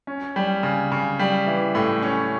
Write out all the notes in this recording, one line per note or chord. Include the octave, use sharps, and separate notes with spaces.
C#4
G3
C#3
C#3
G3
E3
A2
C#4